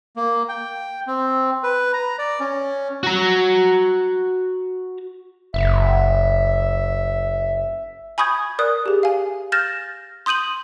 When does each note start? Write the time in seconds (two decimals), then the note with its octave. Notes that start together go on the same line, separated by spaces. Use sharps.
0.16 A#3
0.49 G5
1.07 C4
1.64 B4
1.93 A#5
2.19 D5
2.40 C#4
3.03 F#4 A#5
5.54 F#1 E5
8.18 G#5 B5 C#6 D#6 G6 G#6
8.59 A#4 D5 D#6 F#6
8.86 G4 G#4
9.03 F5 G#5
9.52 F6 G6 A6 A#6 E7
10.26 C6 D#6 G6 D#7 F#7